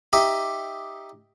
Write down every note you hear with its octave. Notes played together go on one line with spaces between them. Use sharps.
D#4 G4 D#5 E5